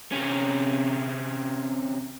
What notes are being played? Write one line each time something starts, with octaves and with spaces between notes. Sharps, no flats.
C3 C#4